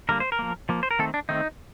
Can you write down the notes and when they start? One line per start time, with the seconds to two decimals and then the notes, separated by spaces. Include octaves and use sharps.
0.09 D3 G3 A#3 A#4
0.20 C5
0.32 A#4
0.39 F3 A#3
0.69 F3 A#3
0.83 C5
0.91 A#4
0.99 D#3 A3 C4 A4
1.14 D4
1.29 D#3 A3 C4 D#4